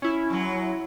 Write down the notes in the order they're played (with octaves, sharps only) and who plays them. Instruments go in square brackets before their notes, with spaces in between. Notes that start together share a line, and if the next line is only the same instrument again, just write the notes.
[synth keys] C#4 E4
[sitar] F#2 F#3